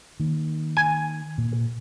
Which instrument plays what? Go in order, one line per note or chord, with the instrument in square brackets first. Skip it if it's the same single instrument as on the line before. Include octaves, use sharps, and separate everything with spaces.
[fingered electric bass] D#3 A#3
[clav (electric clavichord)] G#5
[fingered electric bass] A#2